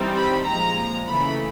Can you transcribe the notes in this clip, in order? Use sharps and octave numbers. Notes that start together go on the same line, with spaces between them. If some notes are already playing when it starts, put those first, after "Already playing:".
Already playing: E3 G3 C4 D#4
B5
A#2 F3 G#3 A#5
C#3 E3 A3 B5